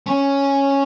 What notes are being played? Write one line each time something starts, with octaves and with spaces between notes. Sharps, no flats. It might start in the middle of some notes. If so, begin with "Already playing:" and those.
C#4